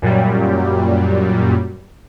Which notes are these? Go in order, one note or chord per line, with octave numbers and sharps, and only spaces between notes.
F#2 A#2 F#3 G3